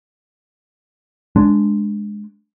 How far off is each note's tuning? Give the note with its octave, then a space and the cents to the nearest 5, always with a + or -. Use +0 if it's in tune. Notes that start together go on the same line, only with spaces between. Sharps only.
G#3 +0 D4 +0